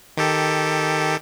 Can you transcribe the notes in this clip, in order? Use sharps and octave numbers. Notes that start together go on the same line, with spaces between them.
D#3 G4 A4